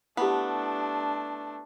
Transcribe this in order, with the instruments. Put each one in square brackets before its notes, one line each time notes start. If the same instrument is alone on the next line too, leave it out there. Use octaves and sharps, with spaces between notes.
[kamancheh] A3 D4 [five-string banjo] B3 [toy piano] E4 G4